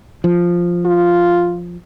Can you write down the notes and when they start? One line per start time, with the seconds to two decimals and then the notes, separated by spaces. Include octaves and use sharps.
0.24 F3
0.86 F4